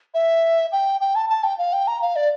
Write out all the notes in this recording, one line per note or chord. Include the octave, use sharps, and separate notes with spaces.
E5
G5
G5
A5
A5
G5
F5
G5
A#5
F5
D5